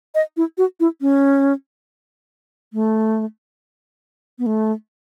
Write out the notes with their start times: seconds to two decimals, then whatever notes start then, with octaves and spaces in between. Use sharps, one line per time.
0.15 D#5
0.37 E4
0.58 F#4
0.80 E4
1.01 C#4
2.73 A3
4.39 B3
4.46 A3